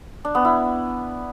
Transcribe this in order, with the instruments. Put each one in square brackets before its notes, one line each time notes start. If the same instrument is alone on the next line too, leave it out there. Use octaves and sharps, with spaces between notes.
[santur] D4
B3
E4